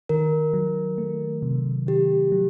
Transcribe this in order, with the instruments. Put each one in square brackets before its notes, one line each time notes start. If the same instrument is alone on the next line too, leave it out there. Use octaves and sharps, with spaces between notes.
[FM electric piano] D#3 [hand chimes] A#4
[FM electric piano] F#3
A3
C3
[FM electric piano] D#3 [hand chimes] G4
[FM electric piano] F#3